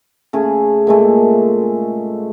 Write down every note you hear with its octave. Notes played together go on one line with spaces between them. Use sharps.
C#3 A3 G#4
A#2 G#3 A3